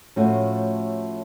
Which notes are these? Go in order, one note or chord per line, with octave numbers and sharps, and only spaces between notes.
A2 F3 A3 C#4 F#4